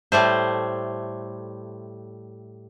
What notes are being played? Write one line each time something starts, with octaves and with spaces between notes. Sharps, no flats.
A2 G3 A3 C5